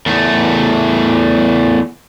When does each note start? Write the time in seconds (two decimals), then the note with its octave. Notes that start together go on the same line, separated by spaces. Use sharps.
0.06 E2 A3